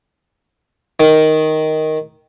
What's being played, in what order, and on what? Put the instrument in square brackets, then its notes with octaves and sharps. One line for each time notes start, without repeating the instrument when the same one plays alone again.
[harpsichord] D#3